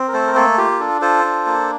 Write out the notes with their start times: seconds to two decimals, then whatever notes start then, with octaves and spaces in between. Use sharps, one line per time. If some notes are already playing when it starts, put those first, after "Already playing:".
Already playing: C4
0.08 A#4
0.13 A3 A4 C5
0.27 A#4
0.35 A#3 A4
0.57 F4 G4
0.80 D4 A4
1.01 F4 A4 C5
1.24 D4
1.46 A#3